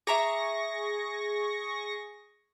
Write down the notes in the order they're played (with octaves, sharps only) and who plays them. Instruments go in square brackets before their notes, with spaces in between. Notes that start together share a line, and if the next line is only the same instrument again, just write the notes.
[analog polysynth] G#4 C#6 A#6 [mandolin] E5 A#5 D6